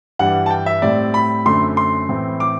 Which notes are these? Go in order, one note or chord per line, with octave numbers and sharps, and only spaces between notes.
G2 E3 G3 D4 F#5
A5
G5
E5
A2 G3 C4 D5
B5
F#2 D3 A3 C4 C6
C6
A2 E3 A3 C4
D6